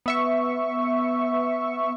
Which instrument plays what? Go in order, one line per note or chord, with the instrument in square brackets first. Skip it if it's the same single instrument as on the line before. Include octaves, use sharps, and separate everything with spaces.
[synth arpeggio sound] B3 E5 C#6